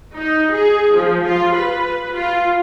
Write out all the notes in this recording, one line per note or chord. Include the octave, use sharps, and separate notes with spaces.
D#4
G#4
F3
F4
B4
F4